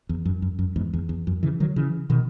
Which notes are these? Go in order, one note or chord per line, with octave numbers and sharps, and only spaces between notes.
E2
F#2
F#2
F#2
E2 G#2
E2
E2
F#2
C#3 E3
D#3 F#3
C#3 E3
B2 D#3